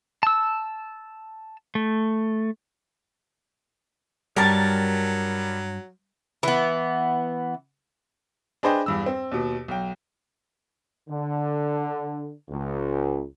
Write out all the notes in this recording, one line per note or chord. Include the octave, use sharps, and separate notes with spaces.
A5 E6
A3
C2 G2 F#3 G3 A#4 A5
E3 B3
D4 G#4 B4 C5 D#5 G5
E2 G2 E6
C4
D#2 B2
B1 G5
D3
C#2